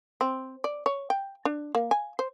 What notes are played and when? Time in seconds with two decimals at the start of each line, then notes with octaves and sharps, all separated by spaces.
0.21 C4
0.64 D5
0.86 C#5
1.10 G5
1.45 D4
1.75 A#3
1.91 G#5
2.19 C5